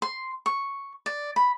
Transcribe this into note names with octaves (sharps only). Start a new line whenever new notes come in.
C6
C#6
D5
B5